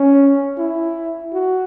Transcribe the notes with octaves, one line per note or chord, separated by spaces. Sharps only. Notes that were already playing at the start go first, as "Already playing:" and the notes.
Already playing: C#4
E4
F#4